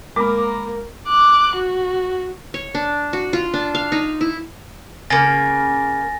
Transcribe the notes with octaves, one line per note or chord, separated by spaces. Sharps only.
G#3 A#3 A#4 B5 D6
D6 F#6
F#4
C#5
D4
F#4
F4
D4
F5
D#4
E4
C#3 A#3 G#5 A6 A#6